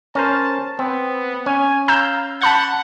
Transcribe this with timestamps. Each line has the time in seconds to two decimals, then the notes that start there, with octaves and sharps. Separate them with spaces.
0.15 C#4 A#4 C5 A5
0.79 B3 C4
1.46 C#4 G#5
1.88 F5 A#5 E6 G6
2.42 F#5 A5 B5 G6